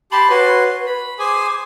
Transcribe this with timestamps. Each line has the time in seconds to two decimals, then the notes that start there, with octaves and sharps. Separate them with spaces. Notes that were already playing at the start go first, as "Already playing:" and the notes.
0.12 G4 A5 B5 C6
0.30 F#4 B4 C#5 C6
0.86 B5
1.19 G#4 C5 G#5 D6